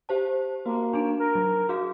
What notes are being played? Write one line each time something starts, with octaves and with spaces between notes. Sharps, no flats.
G4 C5 A5
A#3 F#4
D4 D#4 D7
A#4
F#3
F#4 G#4 F5